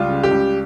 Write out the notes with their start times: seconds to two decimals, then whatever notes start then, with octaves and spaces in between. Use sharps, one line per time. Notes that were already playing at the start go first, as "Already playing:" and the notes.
Already playing: C#2 G3 F4
0.08 C#3
0.23 G4
0.31 C#2